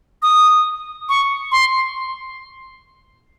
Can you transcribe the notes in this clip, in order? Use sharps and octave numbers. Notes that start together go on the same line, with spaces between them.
D#6
C#6
C6